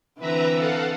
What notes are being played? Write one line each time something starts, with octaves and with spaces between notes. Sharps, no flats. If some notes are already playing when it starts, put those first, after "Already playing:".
D3 E3 C4 B4 E5 A#5
A4 F5 F#5